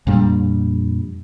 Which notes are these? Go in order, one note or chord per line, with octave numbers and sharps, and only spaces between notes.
F2 A#2 G3 D4